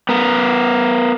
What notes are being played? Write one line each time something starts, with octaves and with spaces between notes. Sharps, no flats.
B3 A#4